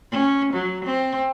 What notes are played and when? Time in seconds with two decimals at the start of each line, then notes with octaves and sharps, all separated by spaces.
0.11 C#4
0.53 F#3
0.85 C4